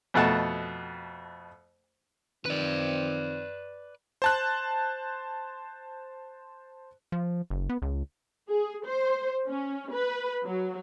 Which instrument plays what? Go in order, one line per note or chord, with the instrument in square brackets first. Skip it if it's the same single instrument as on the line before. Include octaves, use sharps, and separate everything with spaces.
[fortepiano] F2 B2 A3 F#5 A5
[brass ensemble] D#3 F3 C4 [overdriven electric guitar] B4 D5
[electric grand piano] C5 A5 F#6
[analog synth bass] F3
F#1
B3
C#2
[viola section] G#4
C5
C#4
B4
F#3